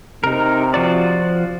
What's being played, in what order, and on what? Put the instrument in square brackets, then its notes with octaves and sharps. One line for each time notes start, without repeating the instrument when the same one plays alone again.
[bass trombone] C3 [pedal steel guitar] D#4 A#4
[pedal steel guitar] F3 F#4 D5